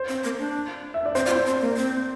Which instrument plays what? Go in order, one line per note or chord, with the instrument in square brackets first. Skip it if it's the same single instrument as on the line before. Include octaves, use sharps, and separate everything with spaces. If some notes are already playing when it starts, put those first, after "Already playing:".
Already playing: [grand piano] C5
[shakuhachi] C4
A#3
D4
[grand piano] E5
D5
[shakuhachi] C4 [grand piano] C5
[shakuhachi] F4 [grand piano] D5
[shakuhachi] E4 [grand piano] C5
[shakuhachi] C4
A#3
C4